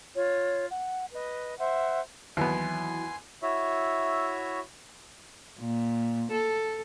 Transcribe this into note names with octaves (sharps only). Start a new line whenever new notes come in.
F4 C#5
F#5
B4 D#5
C5 E5 F#5
D#2 E3 F#3 B3 E4 G#5 C6
E4 F#4 C#5 E5
A#2
A4